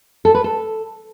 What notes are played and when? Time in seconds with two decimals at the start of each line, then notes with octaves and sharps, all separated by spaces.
0.25 A4
0.35 B4
0.44 A4